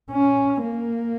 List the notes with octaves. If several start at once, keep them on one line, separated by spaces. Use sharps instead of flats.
C#4
A#3